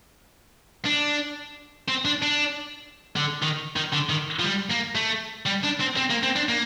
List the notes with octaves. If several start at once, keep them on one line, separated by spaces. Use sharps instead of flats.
D4
C4
D4
D4
D3
D#3
D#3
D3
D#3
F3
G3
A#3
A3
G3
D4
C4
C4
A#3
C4
D4
A#3